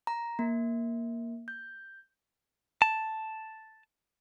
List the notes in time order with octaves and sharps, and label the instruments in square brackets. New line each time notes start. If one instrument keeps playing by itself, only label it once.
[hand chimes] A#5
A#3
G6
[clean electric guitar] A5